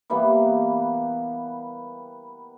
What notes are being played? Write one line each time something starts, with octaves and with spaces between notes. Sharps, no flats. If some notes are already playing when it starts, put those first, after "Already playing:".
E3 G3 A#3 B3